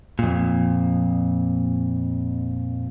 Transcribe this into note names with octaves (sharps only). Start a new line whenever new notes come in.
F2 A#2